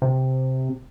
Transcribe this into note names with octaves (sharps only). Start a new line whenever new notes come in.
C3